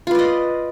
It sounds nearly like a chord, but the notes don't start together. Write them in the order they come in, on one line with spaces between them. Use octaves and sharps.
F4 B4 D5 D#5